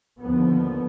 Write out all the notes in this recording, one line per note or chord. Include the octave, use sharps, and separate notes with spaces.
D#2 D3 F3 B3